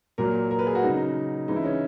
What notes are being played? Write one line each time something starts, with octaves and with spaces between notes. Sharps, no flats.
A#2 F#3 A#4
A#4
B4
G#4
F#4
C#3 F#3 D#4
C#3 E3 G#3 D#4
E4
C#4